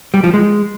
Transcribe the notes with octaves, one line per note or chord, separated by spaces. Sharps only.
G3
F3
G#3